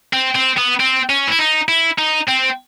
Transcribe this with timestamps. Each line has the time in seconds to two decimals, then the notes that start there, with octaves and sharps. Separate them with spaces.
0.13 C4
0.36 C4
0.58 B3
0.80 C4
1.10 C#4
1.28 E4
1.39 D#4
1.69 E4
1.98 D#4
2.27 C4